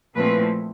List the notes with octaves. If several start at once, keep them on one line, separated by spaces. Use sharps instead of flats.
A#2 F3 A3 C4 E4 B4